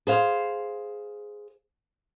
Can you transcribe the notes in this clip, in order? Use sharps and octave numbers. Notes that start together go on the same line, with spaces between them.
G#4 C5 F5